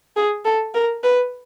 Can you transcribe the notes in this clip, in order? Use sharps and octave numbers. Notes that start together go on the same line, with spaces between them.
G#4
A4
A#4
B4